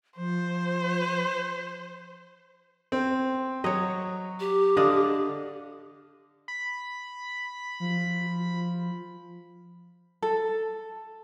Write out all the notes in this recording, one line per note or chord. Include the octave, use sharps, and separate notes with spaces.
F3 C5
C4
F#3 C#5 D#5
G4
D3 D4 D#5 F5
B5
F3
A4